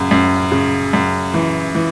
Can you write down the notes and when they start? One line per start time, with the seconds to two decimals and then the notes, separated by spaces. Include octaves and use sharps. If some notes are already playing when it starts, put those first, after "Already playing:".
Already playing: F#2 C#3
0.11 F#2
0.52 C#3
0.93 F#2
1.34 E3
1.75 E3